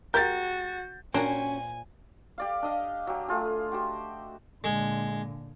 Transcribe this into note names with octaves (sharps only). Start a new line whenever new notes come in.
G#3 F#4 G4 A#4 G6 A6
A#2 C#4 D4 F#4 A#4 C5 G5 G#5
G4 D5 F5
D4 D#5 F5
F#3 G4
A3 F4 G#4
F#4 G4 C5
A#2 D3 G#3